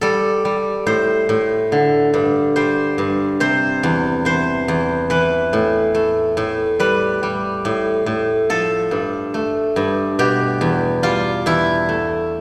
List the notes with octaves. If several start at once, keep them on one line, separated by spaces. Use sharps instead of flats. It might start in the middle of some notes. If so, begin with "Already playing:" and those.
G3 A4
G3
A2 C5
A2
D3
G2
G3 C5
G2
C3 C5
E2
E3 C5
E2
E3 B4
A2
A3
A2
G3 B4
G3
A2
A2
F3 A4
G2
A3
G2
B2 G4
E2
G3 F4
E2 E4
A3